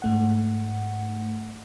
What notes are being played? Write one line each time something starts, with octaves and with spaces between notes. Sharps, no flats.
G#2 A3 F#5